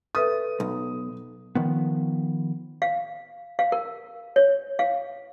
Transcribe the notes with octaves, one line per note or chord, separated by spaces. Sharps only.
A4 B4 E5 D#6
B1
D#3 F3 B3
F5
F5
A#4
C#5
F5